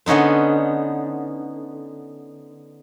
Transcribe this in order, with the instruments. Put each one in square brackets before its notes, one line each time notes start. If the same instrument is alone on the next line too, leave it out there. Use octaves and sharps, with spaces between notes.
[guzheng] D3 B3 C#4 D#4 C5